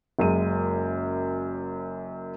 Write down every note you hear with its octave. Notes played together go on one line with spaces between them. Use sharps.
F#1 F#2 G#3 D#7